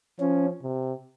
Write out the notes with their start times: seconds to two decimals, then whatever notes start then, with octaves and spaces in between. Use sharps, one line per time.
0.20 F3 C#4
0.63 C3